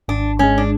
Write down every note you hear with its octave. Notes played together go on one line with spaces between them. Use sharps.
G#1 D4
G#2 G#3 C#4
D4